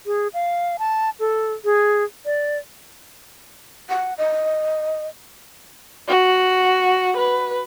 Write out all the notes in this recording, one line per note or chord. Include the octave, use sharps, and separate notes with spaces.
G#4
F5
A5
A4
G#4
D5
F#5
D#5
F#4
B4